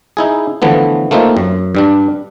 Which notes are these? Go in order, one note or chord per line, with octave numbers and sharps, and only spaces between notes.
D#4 E4 G#4
D3 E3 F3 A3 B3
A3 A#3 C4 D#4 F4
F#2
G2 G3 D4